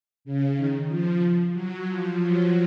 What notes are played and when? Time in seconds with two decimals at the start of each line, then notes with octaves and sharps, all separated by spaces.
0.25 C#3
0.56 D#3
0.88 F3
1.53 F#3
1.86 F3
2.18 F#3